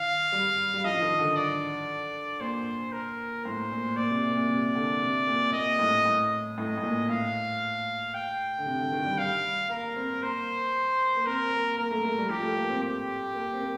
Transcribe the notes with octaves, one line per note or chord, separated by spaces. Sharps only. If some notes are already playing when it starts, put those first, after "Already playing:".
Already playing: D#3 F5
G3
G3
F3 D#5
F3
D#3
D3
D5
A#2 C5
A#4
A2 C5
A#2
A#2 D5
C3
A#2
C3
A#2
C3
D3
C3
A#2
A#2 D#5
A2
A2
A2 D#5
A2
A#2
A2 F5
G5
D3
C3
D3
D#3
G3
G3 F5
A#3 A#4
C4
A#3 C5
A#3
C4 A#4
A#3
A#3 A#4
A3
A3
G3
F3 G4
A3
A#3
C4
G4
A#3
C4
A#3